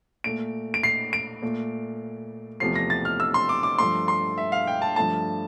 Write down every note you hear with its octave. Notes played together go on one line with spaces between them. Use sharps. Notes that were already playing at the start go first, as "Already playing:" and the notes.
A#2 A3 D7
D7
C7
D7
A#2 A3
E2 C3 F3 A3 C7
A#6
A6
F6
E6
C6
D6
D6
G2 F3 A3 C6
C6
E5
F5
G5
A5
G2 F3 A3 A5